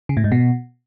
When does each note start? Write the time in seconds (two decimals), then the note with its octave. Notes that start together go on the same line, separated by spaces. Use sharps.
0.09 C#3
0.17 A2
0.24 G#2
0.32 B2